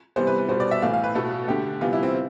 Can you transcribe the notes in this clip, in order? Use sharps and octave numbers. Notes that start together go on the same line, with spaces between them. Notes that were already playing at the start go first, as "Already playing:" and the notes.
C3 E3 G3 B3 C5
B4
B4
B2 G3 B3 C5
D5
E5
A2 E3 A3 F5
F5
B4
B2 A3 A4
D3 A3 G4
C3 E3 G3 B3 F4
E4
C4